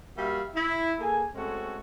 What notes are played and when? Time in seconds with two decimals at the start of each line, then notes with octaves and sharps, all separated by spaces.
0.16 G3 A#3 F#4 E5 F5
0.55 E4
1.00 A#3 G#4 A4 G#5
1.35 G#3 A3 C4 C#4 F#4 A4